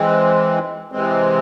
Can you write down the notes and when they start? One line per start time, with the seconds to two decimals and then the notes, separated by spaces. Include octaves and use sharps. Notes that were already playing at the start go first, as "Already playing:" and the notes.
Already playing: E3 G#3 C4
0.92 C3 E3 G#3 C4